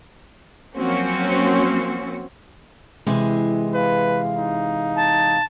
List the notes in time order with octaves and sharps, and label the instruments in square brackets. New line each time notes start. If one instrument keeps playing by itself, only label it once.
[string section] F3 F#3 A#3 C4 C#4 F#4
[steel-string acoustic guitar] C3 E3 G#3 [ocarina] E4
[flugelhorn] B4 [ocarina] F5
[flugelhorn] D#4
[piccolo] A5